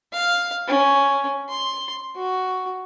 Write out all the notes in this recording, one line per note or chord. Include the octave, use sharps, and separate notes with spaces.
F5
C#4
C6
F#4